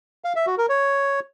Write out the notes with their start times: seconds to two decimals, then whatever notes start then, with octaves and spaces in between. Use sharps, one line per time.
0.24 F5
0.36 E5
0.47 F#4
0.58 A#4
0.69 C#5